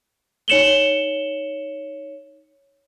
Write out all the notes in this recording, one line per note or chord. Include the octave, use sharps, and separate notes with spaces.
D#4 C#5 C#7 E7 F#7 G7